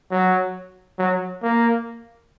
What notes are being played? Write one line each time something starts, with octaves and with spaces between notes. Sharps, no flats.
F#3
F#3
A#3